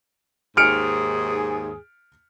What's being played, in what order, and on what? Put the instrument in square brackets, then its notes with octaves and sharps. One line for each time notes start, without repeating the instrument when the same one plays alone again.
[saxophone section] D#2 G#2 G#4 [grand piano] F6 C#7 D7